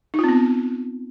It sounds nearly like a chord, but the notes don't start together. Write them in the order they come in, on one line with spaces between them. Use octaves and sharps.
D#4 F4 C4 B3